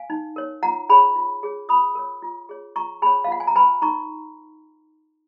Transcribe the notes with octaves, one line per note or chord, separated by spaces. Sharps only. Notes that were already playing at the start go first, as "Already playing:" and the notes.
Already playing: F5 G#5
D#4
A#4 C#5
F4 F#5 A#5
G#4 C#5 G#5 B5
F4
G#4 C#5
F4 B5 D#6
A#4 C#5
F4
G#4 C#5
F4 A#5 C#6
G#4 C#5 G#5 B5
F5
F4 F#5
G#5
A#5
B4 G#5 B5
D#4 A#5 C#6